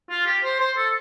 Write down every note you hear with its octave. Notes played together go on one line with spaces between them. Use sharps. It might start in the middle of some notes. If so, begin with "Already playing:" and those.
F4
G4
C5
C5
A4